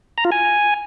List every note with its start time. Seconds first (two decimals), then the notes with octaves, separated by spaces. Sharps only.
0.18 A#5
0.25 F4
0.32 G#5